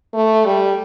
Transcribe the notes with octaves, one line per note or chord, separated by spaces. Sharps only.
A3
G3